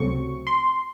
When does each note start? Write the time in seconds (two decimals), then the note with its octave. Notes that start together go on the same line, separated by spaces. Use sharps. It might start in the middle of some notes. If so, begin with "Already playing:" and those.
Already playing: C#2 C3 F#3 A3 C4 C#6
0.47 C6